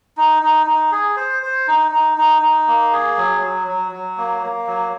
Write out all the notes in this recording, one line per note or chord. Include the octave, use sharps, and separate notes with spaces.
D#4
D#4
D#4
G#4
C5
C5
D#4
D#4
D#4
D#4
A#3
G#4
F#3
F#3
F#3
F#3
A#3
A#3
F#3